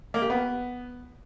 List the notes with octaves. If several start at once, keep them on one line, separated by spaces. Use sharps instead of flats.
A#3
G4
B3